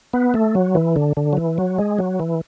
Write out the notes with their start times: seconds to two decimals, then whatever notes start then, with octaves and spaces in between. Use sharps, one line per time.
0.13 B3
0.34 A3
0.55 F#3
0.75 E3
0.96 D3
1.17 D3
1.33 F#3
1.37 E3
1.58 F#3
1.78 G#3
1.99 F#3
2.20 E3